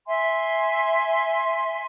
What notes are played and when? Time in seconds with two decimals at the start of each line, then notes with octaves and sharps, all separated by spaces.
0.07 E5 G#5 C6